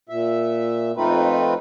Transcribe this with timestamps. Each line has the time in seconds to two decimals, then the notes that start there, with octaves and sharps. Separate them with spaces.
0.09 A#2 E5
0.97 F2 A3 C4 D#4 F4 B4